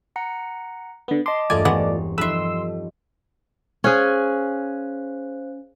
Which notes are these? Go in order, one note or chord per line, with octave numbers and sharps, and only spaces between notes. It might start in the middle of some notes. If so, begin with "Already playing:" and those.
F#5 A#5 C#7
D3 B3
D#5 A5 C6 D6
E1 G2 A3 F4 D5 G#5 D#6
E3 B3 C4 C5 C#5 F#5
F3 G3 D#4 A4 B4 E5 C6 E6
C#4 G#4 C5 F5 F#6